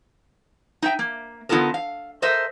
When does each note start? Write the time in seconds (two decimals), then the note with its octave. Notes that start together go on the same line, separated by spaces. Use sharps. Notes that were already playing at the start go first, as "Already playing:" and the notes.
0.82 D#4 E5 G5
0.99 A#3
1.49 D3 B3 D#4 F4 A4 A#4
1.74 F5
2.22 A4 A#4 C5 D#5 E5